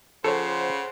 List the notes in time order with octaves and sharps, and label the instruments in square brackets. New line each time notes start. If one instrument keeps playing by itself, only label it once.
[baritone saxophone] C#3 [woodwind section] F3 [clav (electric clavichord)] A4 C#5 [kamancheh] C5 F#5